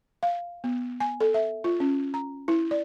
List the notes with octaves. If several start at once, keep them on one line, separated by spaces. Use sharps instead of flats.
F5
B3
G#5
A4
E5
F4
C#4
A#5
E4
D5